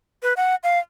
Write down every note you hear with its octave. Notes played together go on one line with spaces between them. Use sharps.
B4
F#5
F5